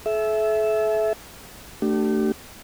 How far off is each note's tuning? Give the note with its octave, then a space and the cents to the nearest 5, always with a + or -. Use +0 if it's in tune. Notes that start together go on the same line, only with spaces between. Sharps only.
A4 -45 E5 +0
A3 +15 D4 +15 G4 -35